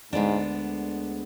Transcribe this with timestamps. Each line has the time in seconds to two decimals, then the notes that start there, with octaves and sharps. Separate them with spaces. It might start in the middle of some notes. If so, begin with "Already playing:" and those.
0.13 D2 G#2 D3 G#3 B3 D4